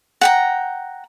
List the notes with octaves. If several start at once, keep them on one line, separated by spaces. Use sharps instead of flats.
F#5 G5 A#5